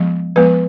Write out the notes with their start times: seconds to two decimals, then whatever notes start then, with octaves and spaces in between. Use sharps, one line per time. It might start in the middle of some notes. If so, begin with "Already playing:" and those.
Already playing: F3 G#3 B3
0.36 F3 G#3 B3 B4